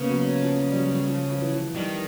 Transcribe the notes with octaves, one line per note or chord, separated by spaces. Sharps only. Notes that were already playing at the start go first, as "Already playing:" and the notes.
Already playing: C#3 A#3 B3 C#4
F#3
F#3
F3
F3
G3
F#3
G3
F3
F3
E3
F3
D#3 G3